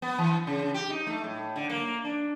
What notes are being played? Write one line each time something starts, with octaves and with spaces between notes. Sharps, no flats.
B3
E3
C#3
G4
D#4
A3
A2
D3
A#3
D4